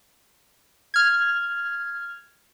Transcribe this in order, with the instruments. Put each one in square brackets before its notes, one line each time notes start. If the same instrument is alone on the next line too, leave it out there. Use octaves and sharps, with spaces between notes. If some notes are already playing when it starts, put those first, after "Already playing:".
[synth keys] F6 G#6